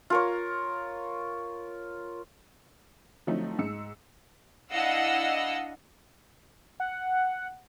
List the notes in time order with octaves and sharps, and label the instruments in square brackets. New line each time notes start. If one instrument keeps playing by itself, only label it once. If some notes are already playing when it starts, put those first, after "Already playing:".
[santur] F4 A#4 C#5
[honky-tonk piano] D3 F3 F#3 A3 C4 D#4
G#2 E6 C#7
[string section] D4 E4 D#5 F5 F#5 E6
[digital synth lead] F#5